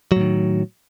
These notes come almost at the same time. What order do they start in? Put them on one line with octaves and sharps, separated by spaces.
F#3 A2 D#3